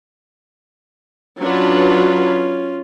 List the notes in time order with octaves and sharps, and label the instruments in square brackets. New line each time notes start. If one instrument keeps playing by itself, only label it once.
[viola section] F#3 D4 B4 [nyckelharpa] C#4 F4